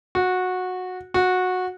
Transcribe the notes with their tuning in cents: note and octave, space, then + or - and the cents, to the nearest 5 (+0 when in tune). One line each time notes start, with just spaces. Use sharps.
F#4 -15
F#4 -15